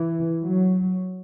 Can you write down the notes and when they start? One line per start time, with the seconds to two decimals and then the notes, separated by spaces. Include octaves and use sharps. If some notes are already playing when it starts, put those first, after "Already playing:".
Already playing: E3
0.43 F#3